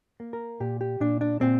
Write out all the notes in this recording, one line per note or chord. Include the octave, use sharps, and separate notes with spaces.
A#3
A#4
A#2 G4
G4
A#2 D4
D4
A#2 C4